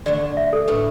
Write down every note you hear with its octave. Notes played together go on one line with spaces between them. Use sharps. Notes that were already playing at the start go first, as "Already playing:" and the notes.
D3 A3 D4 D5
E5
A4
A2 A3 D4 B4